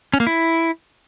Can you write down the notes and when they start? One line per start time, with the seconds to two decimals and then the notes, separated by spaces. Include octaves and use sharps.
0.14 C#4
0.20 A#3
0.27 E4